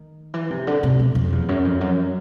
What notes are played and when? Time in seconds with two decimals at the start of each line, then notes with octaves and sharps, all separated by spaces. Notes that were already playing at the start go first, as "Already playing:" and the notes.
Already playing: D#3
0.34 E3
0.50 C3
0.67 D3
0.83 C3
0.99 B2
1.15 F2
1.32 E2
1.49 F#2
1.65 F2
1.81 F#2